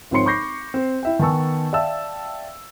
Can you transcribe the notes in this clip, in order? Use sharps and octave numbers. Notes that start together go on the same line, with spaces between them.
G#1 F3 C4 C#5 C6 C#7
B5 C#6 D6 G6 A#6 C7
C4
E4 E5 G5
D#3 B3 G#5 A5 C#6 E6
D5 E5 F5 G5 A5 E6